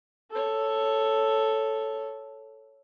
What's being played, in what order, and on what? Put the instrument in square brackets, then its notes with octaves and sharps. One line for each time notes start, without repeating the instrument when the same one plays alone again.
[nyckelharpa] A4 C#5